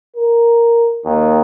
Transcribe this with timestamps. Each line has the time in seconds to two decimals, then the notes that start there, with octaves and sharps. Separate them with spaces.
0.16 A#4
1.05 D#2